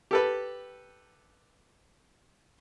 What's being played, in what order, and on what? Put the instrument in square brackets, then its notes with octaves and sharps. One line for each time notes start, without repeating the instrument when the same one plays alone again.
[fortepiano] G4 A4 B4